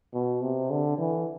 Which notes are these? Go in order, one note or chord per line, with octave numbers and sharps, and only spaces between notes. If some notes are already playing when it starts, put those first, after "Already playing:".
B2
C3
D3
E3